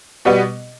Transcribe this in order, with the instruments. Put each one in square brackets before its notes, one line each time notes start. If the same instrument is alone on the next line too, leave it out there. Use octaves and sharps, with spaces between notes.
[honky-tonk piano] B2 G3 B3